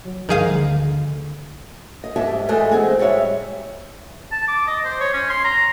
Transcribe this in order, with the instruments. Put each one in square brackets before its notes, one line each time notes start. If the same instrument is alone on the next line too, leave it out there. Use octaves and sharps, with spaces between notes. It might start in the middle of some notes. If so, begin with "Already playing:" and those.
[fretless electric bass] F#3
[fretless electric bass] G1 G2 [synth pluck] D#3 G#4 F5 [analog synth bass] F3
[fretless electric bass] D2 [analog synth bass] D3
[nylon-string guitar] D#5
G#2 G4 E5 G5 A5
E2 E3 G#3 A3 D#5
C4 F#4 G#4
G3 G#3 C#5 E5
[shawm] A5
D6
D#5
C5
C#5
C#4
C6
A#5